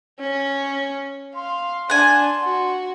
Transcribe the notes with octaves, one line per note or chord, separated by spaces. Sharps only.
C#4
F5 C6
D4 F#5 G#5
F#4